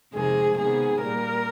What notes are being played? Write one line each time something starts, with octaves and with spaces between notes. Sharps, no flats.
F2 C3 D#3 G#3 G#4
C3 D#3 G#3 B3 G#4
A#2 G3 A#3 A#4